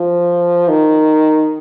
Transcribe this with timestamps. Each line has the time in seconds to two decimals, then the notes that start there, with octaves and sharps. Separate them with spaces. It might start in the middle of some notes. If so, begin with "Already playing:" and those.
Already playing: F3
0.69 D#3